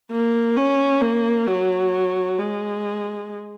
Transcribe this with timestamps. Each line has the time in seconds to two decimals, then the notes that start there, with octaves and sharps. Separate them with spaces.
0.11 A#3
0.56 C#4
1.01 A#3
1.47 F#3
2.38 G#3